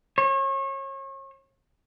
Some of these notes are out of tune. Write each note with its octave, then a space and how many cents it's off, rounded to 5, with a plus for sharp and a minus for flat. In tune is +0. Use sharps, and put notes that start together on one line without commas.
C#5 -35